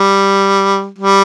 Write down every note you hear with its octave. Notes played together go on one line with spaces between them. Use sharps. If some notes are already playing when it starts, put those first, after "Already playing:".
Already playing: G3
G3